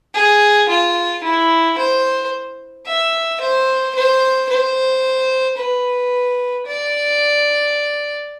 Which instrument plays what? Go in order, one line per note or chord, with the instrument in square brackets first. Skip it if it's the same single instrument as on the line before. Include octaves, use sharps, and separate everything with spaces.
[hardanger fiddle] G#4
F4
E4
C5
E5
C5
C5
C5
B4
D5